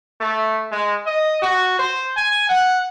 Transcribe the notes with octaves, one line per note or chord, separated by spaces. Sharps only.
A3
G#3
D#5
F#4
C5
G#5
F#5